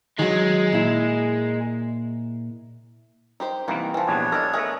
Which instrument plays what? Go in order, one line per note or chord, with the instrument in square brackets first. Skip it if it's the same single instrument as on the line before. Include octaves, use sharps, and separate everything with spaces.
[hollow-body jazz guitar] D#3 F#3 [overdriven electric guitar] G#3
[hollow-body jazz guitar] A#2 E4
[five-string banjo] D#4 G4 C5
[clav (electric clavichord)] C2 E3 A#3 [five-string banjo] D#3 B3
[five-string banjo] E3 F3
[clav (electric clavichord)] A#1 E2 G3 [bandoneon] B3 D4 C#5
[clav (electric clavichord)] A4 D5 [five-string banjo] A#4 D#5
[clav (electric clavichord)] A3 D#5 [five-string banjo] G#4 A#4 E5